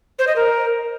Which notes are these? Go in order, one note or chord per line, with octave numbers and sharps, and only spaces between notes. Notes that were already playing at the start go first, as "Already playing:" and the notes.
C5
D#5
A#4